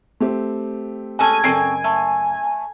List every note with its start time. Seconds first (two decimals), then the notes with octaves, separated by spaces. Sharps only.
0.20 A3 C4 G4
1.19 G#3 C#4 A4 G#5
1.44 F#1 C4 C#4 A4 C7 D7
1.84 A3